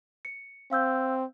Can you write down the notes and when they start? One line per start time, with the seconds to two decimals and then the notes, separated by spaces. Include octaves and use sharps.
0.25 C#7
0.71 C4 F5 E6 G6